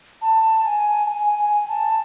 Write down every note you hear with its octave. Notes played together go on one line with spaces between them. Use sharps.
A5
G#5
A5
G#5
G#5
A5